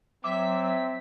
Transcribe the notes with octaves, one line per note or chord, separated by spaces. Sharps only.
F#3 C4 E5 D6 B6